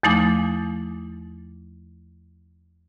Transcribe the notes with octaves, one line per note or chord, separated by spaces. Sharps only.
E2 F3 A3 D#4 G#5 D6